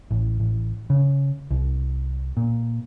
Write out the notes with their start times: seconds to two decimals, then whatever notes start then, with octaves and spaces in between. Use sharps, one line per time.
0.11 A1
0.40 A1
0.90 C#3
1.51 C2
2.37 A#2